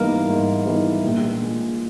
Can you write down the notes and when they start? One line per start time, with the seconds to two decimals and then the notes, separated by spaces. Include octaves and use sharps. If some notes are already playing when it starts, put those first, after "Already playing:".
Already playing: G#2 E3 G3 A#3 B3 D#4
0.28 G#2
0.65 E3 G3 B3 D#4
1.03 A#1
1.42 A#2 G#3